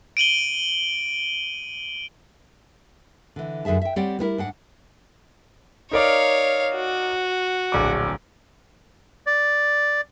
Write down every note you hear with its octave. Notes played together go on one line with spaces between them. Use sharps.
D7 D#7 F#7 G7
D3 E3
F#2 D3 G#4 E5 A5
E5 G5
G3 C4 G4 C#5 D5 F#5
G3 B3 E4 A#4
G#2 D4 F#5
D#4 A#4 C#5 D5 F5
F#4
D1 A#1 D6
D5